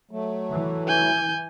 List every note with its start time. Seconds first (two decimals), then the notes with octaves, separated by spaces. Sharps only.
0.11 F#3 A3
0.53 E3
0.88 G#5 G6